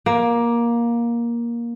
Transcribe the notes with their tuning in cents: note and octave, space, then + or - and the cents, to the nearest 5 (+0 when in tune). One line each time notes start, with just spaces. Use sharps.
A#3 +15